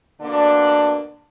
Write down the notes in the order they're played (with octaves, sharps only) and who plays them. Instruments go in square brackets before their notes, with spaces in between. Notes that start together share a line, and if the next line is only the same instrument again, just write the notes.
[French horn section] B2 D3 A#3 D4